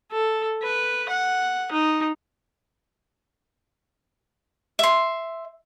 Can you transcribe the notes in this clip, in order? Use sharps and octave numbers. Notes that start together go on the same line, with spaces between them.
A4
B4
F#5
D#4
E5 C6